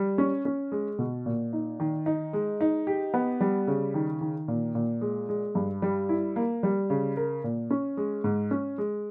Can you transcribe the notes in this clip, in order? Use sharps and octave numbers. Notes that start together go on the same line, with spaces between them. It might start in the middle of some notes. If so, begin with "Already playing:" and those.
Already playing: G3
C#4
C#4
G#3
B2
A#2
D#4
D#3
D#4
G#3
D#4
G4
B3
G3
C#3
D#3
D#3
A#2
A#2
G#3
G#3
G2
G3
E4
A#3
G3
C#3
A#4
A#2
C#4
G#3
G#2
C#4
G#3